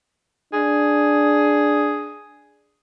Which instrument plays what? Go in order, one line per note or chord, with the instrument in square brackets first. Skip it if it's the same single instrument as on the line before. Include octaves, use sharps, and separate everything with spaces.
[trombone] D4 [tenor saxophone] G#4